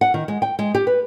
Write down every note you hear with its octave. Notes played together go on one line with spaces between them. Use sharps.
F#5
D#3
G#3
G5
G#3
G4
B4